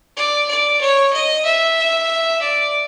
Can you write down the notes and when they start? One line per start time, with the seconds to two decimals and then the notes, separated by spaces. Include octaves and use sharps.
0.17 D5
0.49 D5
0.81 C#5
1.13 D#5
1.45 E5
2.42 D5